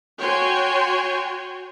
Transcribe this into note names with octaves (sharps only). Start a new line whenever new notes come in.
F#4 C#5 G5 G#5 C6